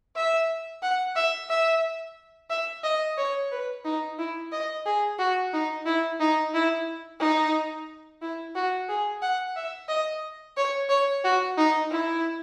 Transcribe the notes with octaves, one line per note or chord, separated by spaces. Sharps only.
E5
F#5
E5
E5
E5
D#5
C#5
B4
D#4
E4
D#5
G#4
F#4
D#4
E4
D#4
E4
D#4
E4
F#4
G#4
F#5
E5
D#5
C#5
C#5
F#4
D#4
E4